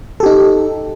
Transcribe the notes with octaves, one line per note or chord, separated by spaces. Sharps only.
D#4 G4 A4